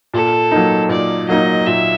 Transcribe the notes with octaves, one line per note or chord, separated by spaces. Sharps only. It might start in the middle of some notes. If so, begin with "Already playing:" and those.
A#2 A4
F#3 A#3 D#4
A#2 D5
F#3 A#3 D#4 D#5
A#2 E5